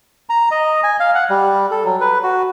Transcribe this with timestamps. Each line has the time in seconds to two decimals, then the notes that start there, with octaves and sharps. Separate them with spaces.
0.29 A#5
0.51 D#5
0.83 G#5
1.00 F5
1.15 F#5
1.30 G3
1.71 A4
1.85 F#3
2.01 B4
2.23 F#4